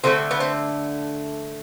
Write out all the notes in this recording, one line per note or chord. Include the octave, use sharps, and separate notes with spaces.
D3 F3 A3 C4
B3
C4